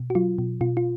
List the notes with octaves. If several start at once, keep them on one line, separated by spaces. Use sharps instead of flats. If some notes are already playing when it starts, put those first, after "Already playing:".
Already playing: B2
F#4
F#3 F4
B2
B2 F4
F4